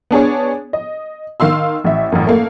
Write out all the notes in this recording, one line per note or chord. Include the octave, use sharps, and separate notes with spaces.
B3 D4 G#4 C#5
D#5
D#3 F5 C6 E6
A1 E5
A1 F#2
A3 A#3 F5